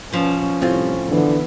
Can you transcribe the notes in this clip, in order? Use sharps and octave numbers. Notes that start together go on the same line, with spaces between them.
B2 F3 C#4
C2 A2 C4 C#4 F4
D3 E3 B3